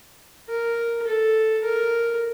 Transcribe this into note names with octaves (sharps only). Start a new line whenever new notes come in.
A#4
A4
A#4